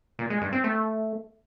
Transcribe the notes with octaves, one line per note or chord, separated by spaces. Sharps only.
A#2
G#3
G2
C4
A3